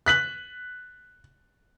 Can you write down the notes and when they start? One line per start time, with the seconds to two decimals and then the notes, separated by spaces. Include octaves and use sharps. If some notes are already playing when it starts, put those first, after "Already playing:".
0.06 F#6 B6 F#7